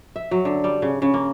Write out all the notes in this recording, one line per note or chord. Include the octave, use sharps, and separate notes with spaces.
E5
F#3
D3
G3
C#3
C#3
A#3